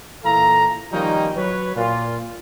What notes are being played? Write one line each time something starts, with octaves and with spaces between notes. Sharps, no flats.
A#2 E3 A4 F5 A#5
D#3 F3 G3 A#3 C#4 D#4
F#3 B4 C#5
A#2 F4